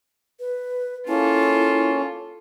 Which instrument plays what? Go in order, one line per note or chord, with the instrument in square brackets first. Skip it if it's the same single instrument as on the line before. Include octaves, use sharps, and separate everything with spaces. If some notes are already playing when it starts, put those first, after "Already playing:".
[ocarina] B4
[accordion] A#3 C#4 [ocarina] E4 [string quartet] F4 A4